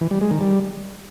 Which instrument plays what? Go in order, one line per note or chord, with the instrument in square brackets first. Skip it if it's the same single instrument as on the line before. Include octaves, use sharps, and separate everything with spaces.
[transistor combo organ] E3
G3
G#3
D#3
G3